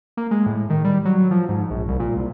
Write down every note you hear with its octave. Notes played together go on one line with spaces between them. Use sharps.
A#3
G#3
A2
D#3
G3
F#3
F3
G#2
A#1
C2
A#2
C2